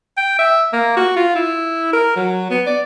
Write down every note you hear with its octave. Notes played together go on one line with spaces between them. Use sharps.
G5
E5
A#3
F#4
F4
E4
A#4
F#3
B3
D5